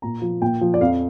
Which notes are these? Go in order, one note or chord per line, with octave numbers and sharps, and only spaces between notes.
A#2 A#5
F3
A#2 G5
F3
D5
F2 F5